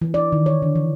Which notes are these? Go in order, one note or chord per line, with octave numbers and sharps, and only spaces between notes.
E3
D5
D#3
C#5
D3
E3